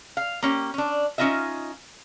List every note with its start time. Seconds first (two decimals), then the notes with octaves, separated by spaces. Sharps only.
0.17 F5
0.42 A#3 C#4 G4
0.74 C#4 D4
1.18 C#4 D#4 F4 D#5 E5